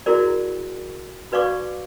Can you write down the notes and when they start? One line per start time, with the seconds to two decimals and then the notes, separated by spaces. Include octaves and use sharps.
0.06 E4 F#4 G#4 A#4 D5
1.32 F#4 B4 D5 F5 C#6 D6